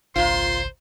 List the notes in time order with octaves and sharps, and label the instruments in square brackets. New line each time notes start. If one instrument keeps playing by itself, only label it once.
[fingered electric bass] G#1 C#2 [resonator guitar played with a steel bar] A#2 F4 [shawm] C5 [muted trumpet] C6